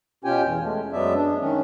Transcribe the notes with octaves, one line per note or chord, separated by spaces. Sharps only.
B2 C#4 F4 G4 G5 G#5
E2
G#3 A3
F#2 F#3 G#3 B3 D5 E5
D4
D#3 C#4